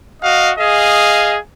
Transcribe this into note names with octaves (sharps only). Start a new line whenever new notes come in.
F#4 D#5 F5
G#4 D#5 F5